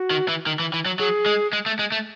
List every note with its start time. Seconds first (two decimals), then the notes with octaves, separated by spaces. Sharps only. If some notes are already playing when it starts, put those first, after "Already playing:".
Already playing: F#4
0.11 D#3
0.28 E3
0.46 D#3
0.60 E3
0.74 E3
0.86 F#3
0.99 F#3 G#4
1.26 G#3
1.53 G#3
1.66 A3
1.79 G#3
1.92 A3